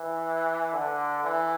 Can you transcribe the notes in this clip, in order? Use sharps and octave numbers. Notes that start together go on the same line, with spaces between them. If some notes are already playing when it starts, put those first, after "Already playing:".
Already playing: E3
D3
E3